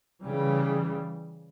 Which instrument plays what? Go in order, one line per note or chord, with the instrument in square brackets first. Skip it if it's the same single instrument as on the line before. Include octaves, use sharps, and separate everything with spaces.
[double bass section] C#3 E3 G3